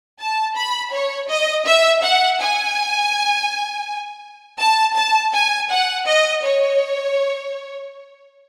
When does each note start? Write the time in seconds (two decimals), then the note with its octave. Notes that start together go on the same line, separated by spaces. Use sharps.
0.19 A5
0.56 B5
0.93 C#5
1.29 D#5
1.66 E5
2.03 F#5
2.40 G#5
4.60 A5
4.97 A5
5.34 G#5
5.71 F#5
6.07 D#5
6.44 C#5